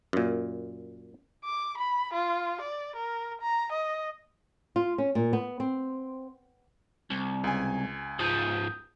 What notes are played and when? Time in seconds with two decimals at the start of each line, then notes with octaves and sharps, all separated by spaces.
0.13 F#2 A#2
1.45 D6
1.78 B5
2.13 F4
2.61 D5
2.96 A#4
3.41 A#5
3.72 D#5
4.76 F4
4.98 C#4
5.15 A#2
5.33 B3
5.60 C4
7.11 C2
7.44 C#2 G#5
8.19 G#2 F3 D#6 G6